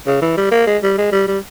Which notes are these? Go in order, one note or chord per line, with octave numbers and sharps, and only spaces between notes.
C#3
E3
G3
A#3
G#3
G3
G#3
G3
G3